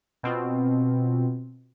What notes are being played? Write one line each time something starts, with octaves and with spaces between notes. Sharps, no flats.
B2 C4 F4